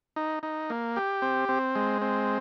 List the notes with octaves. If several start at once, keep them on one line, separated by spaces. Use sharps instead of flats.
D#4
D#4
A#3
G4
C4
C4
G#3
C4